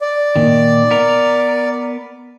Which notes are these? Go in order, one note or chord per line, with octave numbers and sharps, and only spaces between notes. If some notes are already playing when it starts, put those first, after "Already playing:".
D5
A#2 D#3
B3 A#4